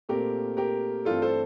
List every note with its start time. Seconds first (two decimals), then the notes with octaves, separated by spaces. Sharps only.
0.09 A#2 A3 C4 G4 A#4
0.57 G4 A#4
1.05 G2 E3 A3 C4 F4 A4
1.22 A4 C5